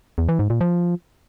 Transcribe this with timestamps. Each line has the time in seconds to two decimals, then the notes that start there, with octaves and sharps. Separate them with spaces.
0.18 E2
0.29 E3
0.39 G#2
0.50 A#2
0.61 F3